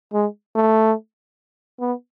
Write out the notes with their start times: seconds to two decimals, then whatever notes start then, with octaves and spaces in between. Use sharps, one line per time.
0.14 G#3
0.55 A3
1.80 B3